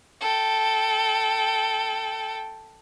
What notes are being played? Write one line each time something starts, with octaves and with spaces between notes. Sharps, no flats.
A4 G5